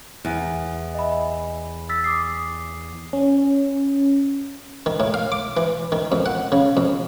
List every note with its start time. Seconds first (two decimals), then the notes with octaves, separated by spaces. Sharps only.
0.25 E2
0.95 D#5 E5 B5
1.89 E6 A6 B6
2.04 D6 D#6 C7
3.13 C#4
4.86 D#3
5.00 A2
5.14 F5
5.32 D6
5.57 E3
5.92 D#3
6.12 F2
6.26 F#5
6.52 C#3
6.77 F2